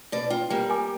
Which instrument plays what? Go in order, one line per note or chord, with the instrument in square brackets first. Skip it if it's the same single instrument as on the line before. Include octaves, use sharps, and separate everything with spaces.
[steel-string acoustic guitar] B2 D5
[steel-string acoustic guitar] F4 [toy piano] G5
[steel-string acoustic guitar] G3 A#3 [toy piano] G5
[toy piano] A#4 G#5 D6